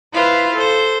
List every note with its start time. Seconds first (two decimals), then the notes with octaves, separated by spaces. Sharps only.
0.13 E4 F4 B4 C5 F5
0.54 A4 C5